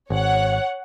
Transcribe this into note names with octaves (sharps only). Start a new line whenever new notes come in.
G#1 C#5 F#5